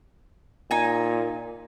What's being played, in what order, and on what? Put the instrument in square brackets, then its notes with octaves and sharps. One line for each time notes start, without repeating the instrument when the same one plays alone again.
[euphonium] A#2 [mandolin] D#4 G#5